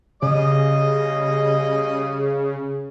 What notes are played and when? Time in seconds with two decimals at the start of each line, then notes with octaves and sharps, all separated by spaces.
0.22 C#3 G3 D#5 D#6